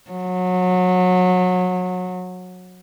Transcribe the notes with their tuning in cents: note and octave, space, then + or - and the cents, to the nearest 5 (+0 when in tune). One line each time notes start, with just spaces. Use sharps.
F#3 -25